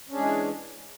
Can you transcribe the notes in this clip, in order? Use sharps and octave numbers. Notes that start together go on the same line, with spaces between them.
E3 G#3 C#4 D4 G#4